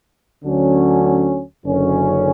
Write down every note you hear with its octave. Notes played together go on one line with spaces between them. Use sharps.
D2 D3 F#3 C#4
F#1 F#2 D3 F#3 C#4